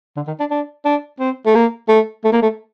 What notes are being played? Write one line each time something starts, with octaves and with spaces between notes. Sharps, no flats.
D3
D#3
D4
D4
D4
C4
A3
A#3
A3
A3
A#3
A3